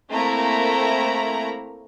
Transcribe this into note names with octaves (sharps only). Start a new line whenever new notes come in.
A3 A#3 C4 E4 A#5